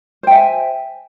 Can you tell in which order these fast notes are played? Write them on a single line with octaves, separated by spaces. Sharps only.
C5 G5 E5 G#5